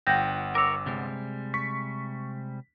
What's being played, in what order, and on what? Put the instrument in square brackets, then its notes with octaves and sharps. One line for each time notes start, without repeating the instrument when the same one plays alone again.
[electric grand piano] G1 F#5 [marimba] G5 G6 A#6
[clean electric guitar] A#4 C#5 [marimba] D6 E6 A#6
[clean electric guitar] C3 G3 G#3
[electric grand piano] C#6 B6